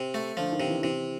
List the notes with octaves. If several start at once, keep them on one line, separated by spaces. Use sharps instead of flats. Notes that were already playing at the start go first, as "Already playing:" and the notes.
Already playing: C3
A3
D3 F3
D#3
C3
E3
C3 E3